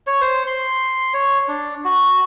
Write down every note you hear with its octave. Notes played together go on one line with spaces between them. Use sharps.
C#5
C5
C6
C#5
D4
F#4